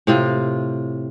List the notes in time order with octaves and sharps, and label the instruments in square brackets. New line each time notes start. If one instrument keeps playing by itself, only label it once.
[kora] A2 C3 F4